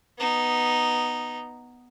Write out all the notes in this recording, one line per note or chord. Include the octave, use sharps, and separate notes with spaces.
B3 D#4